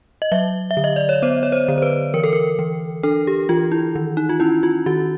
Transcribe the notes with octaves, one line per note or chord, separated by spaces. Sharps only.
D#5
F#3 E5
E5
D3
D#5
D5
C#5
B3 C5
C#5
C5
D3
C5
B4
E3 A#4
A4
A#4
E3
D4 A4
G4
E3 F4
E4
D#3
D#4
F4
C#4 E4
F4
D#3 F#4